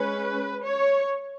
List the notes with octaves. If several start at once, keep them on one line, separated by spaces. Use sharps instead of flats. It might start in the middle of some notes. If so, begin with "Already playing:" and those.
Already playing: G#3 C#4 B4
C#5